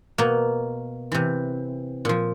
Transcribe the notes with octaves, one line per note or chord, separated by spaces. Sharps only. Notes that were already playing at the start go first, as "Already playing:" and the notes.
B2 A#3
C3 E3
A#2 F3